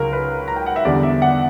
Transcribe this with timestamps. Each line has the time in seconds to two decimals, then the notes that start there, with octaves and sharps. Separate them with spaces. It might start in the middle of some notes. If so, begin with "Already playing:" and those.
Already playing: C#2 C#3 F#3 A#4
0.13 B4
0.48 A#5
0.56 G5
0.66 F#5
0.76 E5
0.85 E2 D3 G3 D5
1.03 E5
1.22 F#5